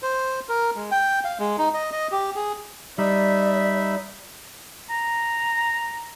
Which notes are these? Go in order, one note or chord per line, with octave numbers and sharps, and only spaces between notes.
C5
A#4
G#3
G5
F5
G#3
D#4
D#5
D#5
G4
G#4
G3 D#4 D5 E5 B5
A#5